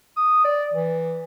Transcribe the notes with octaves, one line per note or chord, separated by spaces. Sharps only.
D#6
D5
E3